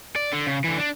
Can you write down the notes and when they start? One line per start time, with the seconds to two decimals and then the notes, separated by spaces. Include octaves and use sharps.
0.16 D5
0.33 D3
0.47 C#3
0.64 D3 E3
0.78 D4